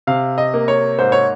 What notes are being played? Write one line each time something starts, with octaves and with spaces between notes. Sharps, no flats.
C3 F5
D#5
A#3
C#5
G#2 C5
C#5